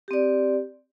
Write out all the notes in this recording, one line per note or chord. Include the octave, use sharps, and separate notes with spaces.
C4 G4 D5